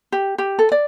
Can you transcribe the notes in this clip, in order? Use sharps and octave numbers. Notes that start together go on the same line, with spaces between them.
G4
G4
A4
D5